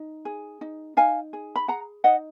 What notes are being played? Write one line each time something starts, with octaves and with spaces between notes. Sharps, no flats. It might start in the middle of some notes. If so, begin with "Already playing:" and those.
Already playing: D#4
G#4
D#4
D#4 F5 G#5
G#4
B5
G#4 F#5 A#5
D#4 D#5 F#5